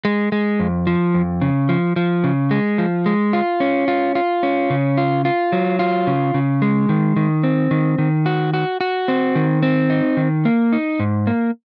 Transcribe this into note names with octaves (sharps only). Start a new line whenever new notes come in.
G#3
G#3
F2
F3
F2
C#3
F3
F3
C#3
G#3
F3
G#3
F4
C#4
F4
F4
C#4
C#3
F4
F4
F#3
F4
C#3
C#3
G#3
D#3
D#3
C4
D#3
D#3
F#4
F#4
F#4
C4
D#3
C4
D#4
D#3
A#3
D#4
G#2
A#3